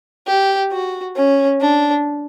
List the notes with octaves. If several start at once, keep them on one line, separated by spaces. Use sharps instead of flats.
G4
F#4
C#4
D4